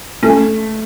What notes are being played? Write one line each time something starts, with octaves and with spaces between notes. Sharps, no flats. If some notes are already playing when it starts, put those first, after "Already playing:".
A3 C#4